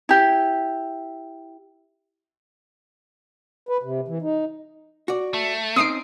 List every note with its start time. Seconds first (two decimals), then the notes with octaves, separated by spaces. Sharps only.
0.09 E4 G4
3.69 B4
3.83 C3
4.08 E3
4.22 D#4
5.08 F#4 D5
5.34 A3
5.76 C4 C#4 D#4 D#6 C7 D7